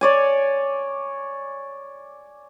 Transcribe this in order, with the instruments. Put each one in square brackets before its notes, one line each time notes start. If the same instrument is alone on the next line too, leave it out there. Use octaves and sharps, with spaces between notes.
[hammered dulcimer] C#5 D5 G#5